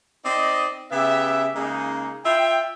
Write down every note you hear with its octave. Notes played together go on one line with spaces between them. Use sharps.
C4 D#4 D5 D#5
C#3 B3 G4 E5
C#3 G#3 A#3 D#4
F4 E5 G5